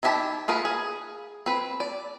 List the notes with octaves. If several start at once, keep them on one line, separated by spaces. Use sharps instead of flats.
D#3 E4 F#4 G4 A5
F4 G#4 A#4 B4 F#5
G#4
C4 B4
D5